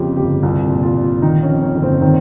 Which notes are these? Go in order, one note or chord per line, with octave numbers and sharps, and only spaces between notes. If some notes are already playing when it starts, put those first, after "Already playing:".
Already playing: F2 C#3 F4 G4
G1 G4
C2 F4
A#2
F4
A#2
D#3 D#4
C#4
F2
C#4
G1
C4
D#3 C4